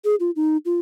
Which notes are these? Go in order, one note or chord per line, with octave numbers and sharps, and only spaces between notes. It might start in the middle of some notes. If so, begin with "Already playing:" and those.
G#4
F4
D#4
F4